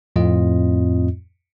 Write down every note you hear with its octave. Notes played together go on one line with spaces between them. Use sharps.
F2 A2 C4 F4 D#5